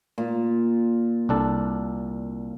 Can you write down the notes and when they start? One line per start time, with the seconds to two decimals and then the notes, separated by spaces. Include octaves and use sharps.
0.18 A#2
1.29 C2 D4 A4